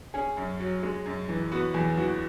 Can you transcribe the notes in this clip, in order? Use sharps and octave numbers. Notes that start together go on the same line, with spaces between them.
C#4 G#4
F#2
F#3
G#3
F#2
E3
B3 F#4
E2 G#4
E3 F#4